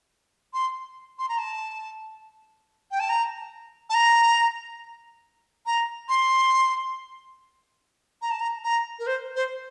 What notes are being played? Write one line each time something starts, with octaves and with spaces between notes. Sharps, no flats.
C6
C6
A#5
A5
G5
A5
A#5
A5
A#5
A#5
C6
A#5
A5
A#5
A#5
A#4
C5
C5